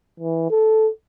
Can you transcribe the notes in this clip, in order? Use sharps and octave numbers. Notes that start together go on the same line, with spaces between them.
E3
A4